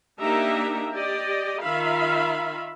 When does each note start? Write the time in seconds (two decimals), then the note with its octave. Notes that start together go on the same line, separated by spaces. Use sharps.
0.19 A#3 D4 D#4 G4 E5 A#5
0.92 G4 D5 D#5
1.62 D#3 D#4 F4 E5 F5 B5